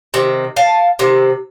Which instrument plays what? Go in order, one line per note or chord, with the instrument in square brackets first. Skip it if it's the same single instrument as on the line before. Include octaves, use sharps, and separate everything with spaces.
[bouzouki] C3 D#3
F5 A5
C3 D#3